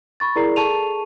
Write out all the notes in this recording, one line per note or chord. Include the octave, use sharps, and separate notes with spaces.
B5 C#6 A6
E4 G#4 A#4 D5 A#5 C7
G#4 A4 A5 C#6 D#7 F7